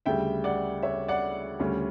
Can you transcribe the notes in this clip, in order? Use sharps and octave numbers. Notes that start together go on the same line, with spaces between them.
D2 C#3 G3 E5 G5
D5 F#5
C#5 E5
D5 F#5
D2 C#3 G3 C#4